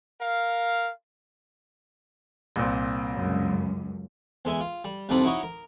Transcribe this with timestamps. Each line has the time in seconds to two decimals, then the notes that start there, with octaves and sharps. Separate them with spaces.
0.20 A#4 F5
2.56 C2 A#2 C4
3.11 C#2 F#2
4.45 E2 G#3 E5 G#5
4.61 F4
4.84 G3
5.09 C2 F2 D#3 C4 D4 B5
5.24 D#4 E4 F#4 C#5 D#5
5.43 A#4